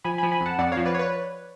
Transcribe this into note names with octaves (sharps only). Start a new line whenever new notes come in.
F3 G#5 B5
F3 G#5 B5
G#5 B5
F2 F#5 A5
F2 D5 F#5
C#5 F5
F3
B4 D5
C#5
B4